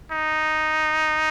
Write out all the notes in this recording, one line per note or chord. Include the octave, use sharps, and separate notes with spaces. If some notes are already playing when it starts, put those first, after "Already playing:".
D#4